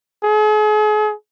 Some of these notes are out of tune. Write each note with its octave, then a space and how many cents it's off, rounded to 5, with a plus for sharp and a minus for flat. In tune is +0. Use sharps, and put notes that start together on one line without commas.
G#4 +40